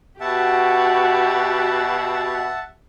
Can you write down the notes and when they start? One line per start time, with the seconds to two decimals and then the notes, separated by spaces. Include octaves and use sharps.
0.20 B2 F#4 G4 E5 F#5 A5